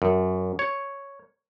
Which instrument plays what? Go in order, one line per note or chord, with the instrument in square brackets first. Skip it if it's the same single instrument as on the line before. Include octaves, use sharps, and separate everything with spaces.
[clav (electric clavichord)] F#2
C#5